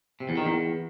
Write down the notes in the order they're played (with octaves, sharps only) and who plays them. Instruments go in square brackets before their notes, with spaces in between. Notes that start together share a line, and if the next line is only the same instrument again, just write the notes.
[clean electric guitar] C3
E2
D#3
E2